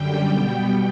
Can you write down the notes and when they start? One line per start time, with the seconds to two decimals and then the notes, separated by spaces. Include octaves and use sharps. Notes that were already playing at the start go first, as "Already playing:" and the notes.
Already playing: F#2 D3 G3 G5
0.29 B2 G3 B3 G5